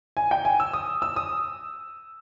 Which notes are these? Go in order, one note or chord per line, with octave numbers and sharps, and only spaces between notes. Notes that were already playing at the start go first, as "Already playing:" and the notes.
G#5
G5
G#5
E6
D#6
E6
D#6